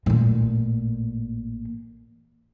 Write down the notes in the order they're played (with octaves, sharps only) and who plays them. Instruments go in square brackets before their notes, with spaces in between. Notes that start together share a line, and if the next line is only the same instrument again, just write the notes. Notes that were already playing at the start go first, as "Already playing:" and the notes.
[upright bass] A1 A#2